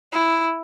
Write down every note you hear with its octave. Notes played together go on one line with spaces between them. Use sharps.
E4